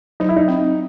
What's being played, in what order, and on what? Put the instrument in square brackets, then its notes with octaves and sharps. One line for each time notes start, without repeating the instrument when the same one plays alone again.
[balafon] F#3 [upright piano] D#4
[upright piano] E4
D#4
[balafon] C4